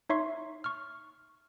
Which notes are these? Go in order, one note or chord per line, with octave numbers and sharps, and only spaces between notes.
D#4 C#5 E5 C6 C#6 C7
C#6 F6